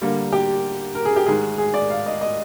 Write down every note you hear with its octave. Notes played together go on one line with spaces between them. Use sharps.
D3 G3 A#3
G4
A#4
G#4
G4
G#2 D#3 G#3 G#4
G#4
D5
F5
D#5
D#5